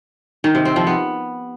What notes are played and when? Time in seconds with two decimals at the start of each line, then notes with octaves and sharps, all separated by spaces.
0.44 D#3
0.55 C3
0.65 C4
0.76 F3
0.87 B3